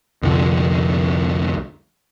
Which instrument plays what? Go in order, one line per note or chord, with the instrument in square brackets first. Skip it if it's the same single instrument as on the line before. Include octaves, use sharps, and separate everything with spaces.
[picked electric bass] C2 F2 D3 F3